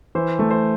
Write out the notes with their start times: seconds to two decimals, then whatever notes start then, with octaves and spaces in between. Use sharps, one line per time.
0.15 E3 C5
0.39 A3
0.51 C5